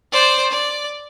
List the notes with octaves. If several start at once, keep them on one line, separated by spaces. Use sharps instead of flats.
C5 D5
D5